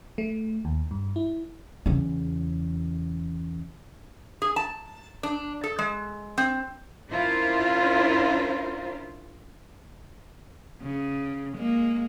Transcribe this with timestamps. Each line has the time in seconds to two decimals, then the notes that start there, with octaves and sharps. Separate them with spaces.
0.18 A3
0.65 D#2
0.91 G2
1.16 E4
1.86 E2 C#3
4.42 G#4
4.56 A5
5.23 D4
5.64 A4
5.79 G#3
6.38 C4
7.10 C#4 D4 E4 F4 A#4 C5
10.82 C#3
11.57 G#3 A#3